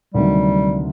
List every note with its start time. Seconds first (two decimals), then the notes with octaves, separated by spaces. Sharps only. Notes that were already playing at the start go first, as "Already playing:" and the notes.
0.14 D2 C3 D#3 F#3 G3